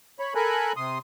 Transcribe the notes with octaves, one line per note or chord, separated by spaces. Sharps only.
C#5 B5
A4 A#4 G#5 B5 F#6
C3 C6 D#6